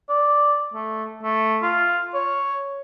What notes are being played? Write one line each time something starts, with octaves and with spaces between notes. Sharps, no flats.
D5
A3
A3
F4
C#5